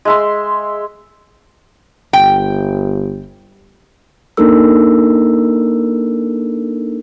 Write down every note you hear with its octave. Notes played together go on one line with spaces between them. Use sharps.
G#3 E5 C6
G1 G5
A#3 D4 D#4 A4 A#4 E6